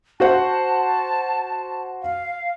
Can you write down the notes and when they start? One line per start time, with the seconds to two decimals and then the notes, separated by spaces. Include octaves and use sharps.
0.20 F#4 C5 F#5 A5
2.02 F5